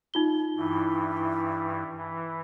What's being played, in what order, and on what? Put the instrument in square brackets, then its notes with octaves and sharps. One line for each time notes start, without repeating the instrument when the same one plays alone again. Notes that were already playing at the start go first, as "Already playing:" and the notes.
[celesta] D#4 F4 G7
[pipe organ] G2 E3 [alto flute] E4
[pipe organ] E3